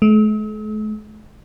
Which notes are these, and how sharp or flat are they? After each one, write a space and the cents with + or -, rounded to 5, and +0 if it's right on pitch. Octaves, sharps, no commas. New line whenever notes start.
A3 -45